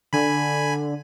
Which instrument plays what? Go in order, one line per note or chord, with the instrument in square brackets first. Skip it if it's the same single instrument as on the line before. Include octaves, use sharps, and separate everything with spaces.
[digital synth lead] D3 [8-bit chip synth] G#5 B5